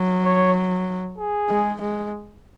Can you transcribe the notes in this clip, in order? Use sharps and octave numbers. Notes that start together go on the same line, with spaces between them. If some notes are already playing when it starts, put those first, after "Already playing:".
Already playing: F#3
C#5
G#4
G#3
G#3